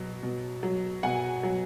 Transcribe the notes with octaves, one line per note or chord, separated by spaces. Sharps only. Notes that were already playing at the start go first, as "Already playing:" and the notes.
Already playing: B2 F#3
B2
F#3
B2 F#5 G#5
F#3